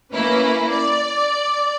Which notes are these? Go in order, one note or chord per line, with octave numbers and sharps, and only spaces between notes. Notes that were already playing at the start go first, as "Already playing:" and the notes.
A#3 C#4 E4 B4
D5